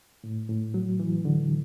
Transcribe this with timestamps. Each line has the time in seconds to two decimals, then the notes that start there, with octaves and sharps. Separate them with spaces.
0.24 A2
0.49 A2
0.74 F#3
1.00 E3
1.25 D3